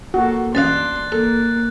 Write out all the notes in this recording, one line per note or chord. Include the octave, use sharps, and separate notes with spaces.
A#3 F#4 A4
A1 D4 D#5 F5 C6 F#6 A6
A#3 A4